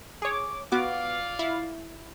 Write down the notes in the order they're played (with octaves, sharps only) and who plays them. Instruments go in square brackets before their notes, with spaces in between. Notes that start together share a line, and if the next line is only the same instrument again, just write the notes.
[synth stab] G#4 C#5 [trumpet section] D6
[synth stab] B3 F#4 D6 [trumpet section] F4 D5 F5
[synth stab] E4